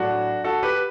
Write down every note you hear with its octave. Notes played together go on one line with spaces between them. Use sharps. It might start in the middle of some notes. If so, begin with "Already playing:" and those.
Already playing: A2 F#3 D4 F#4
F#4 A4
G4 B4